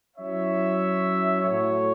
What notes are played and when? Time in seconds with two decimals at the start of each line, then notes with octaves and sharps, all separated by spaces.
0.17 F#3 C#4 E4 C#5 E5
1.41 A2 A3 F#4 C#5